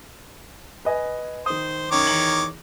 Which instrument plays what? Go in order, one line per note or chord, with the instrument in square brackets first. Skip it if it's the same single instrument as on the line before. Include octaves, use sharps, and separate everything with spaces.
[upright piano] B4 D#5 G#5
[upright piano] D#3 D#6 [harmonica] C5
[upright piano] F#2 [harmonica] D#3 C#5 D6
[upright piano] E2 A#5 F#7